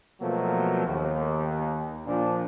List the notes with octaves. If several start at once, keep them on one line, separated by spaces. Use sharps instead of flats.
B2 F3 F#3 A3 A#3
D#2
A#2 F3 D4